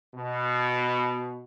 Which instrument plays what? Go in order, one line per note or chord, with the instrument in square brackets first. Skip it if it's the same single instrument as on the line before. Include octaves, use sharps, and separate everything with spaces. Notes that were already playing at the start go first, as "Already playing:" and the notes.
[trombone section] B2